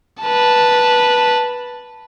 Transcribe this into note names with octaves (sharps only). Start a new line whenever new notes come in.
B4 A5